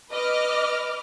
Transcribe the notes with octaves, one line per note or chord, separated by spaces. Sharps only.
B4 D#5 D6 F6